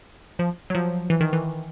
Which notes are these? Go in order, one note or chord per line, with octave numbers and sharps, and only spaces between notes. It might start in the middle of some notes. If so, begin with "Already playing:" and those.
F3
F#3
F3
E3
D#3
E3